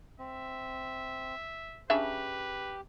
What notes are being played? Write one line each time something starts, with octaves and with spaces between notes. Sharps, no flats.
C4 E5
C#3 D4 G4 B4 E5